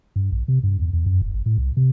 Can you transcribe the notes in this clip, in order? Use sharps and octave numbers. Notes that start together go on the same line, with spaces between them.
G2
A#1
C3
G2
E2
E2
F#2
E1
G#1
A2
C2
C3